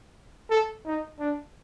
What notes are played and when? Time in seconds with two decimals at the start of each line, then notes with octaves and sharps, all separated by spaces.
0.50 A4
0.86 D#4
1.20 D4